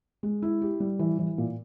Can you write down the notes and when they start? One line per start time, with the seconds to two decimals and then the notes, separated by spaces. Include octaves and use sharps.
0.23 G#3
0.42 E4
0.62 G4
0.80 G3
0.99 E3
1.19 E3
1.38 A#2